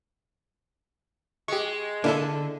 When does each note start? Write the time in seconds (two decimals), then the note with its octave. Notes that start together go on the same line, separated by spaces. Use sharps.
1.48 G#3 G4 C#6
2.04 D3 A#3 D4 E4 A4